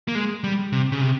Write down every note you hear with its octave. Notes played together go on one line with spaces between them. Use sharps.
A#3
G#3
G3
C3
C#3
C3